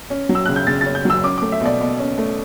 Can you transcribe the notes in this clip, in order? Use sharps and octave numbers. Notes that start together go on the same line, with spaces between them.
C#4
F#3
E6
C#3 F#6
G6
C#3 A6
C#4 A6
G6
F#3 E6
C#4 D6
A3 D6
E5
B2 D5
B2
C#4
A3